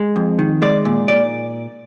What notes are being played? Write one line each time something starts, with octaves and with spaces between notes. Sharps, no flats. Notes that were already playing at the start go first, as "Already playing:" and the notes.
Already playing: G#3
F2
D#3
G#3 D5
A#2
A#2 D5